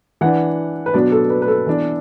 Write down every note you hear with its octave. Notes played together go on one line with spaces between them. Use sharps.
E3 D4 F#5
B4
B2 F#3 B3 D4 D5
A4
B4
B4
A4
E3 B3 D4